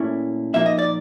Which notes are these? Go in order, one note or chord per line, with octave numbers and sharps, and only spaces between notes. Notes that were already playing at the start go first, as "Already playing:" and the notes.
Already playing: A#2 A3 C#4 E4
A#2 F3 A#3 D#4 E5
D#5
D5